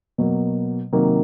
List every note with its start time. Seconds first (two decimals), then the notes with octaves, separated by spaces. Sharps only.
0.18 B2 F#3 A#3
0.92 C3 D#3 F#3 A#3